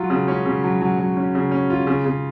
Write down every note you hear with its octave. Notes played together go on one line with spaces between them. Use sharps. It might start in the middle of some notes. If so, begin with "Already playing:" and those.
Already playing: F#3 F4
C#3
C#4
C#3
F#3
F#3
F#3
C#4
C#3
C#4
F4
C#3
C#3